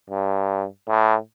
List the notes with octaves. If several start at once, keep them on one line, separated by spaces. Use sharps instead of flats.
G2
A2